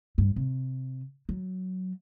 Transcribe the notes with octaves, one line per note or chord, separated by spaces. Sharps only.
G2
C3
F#3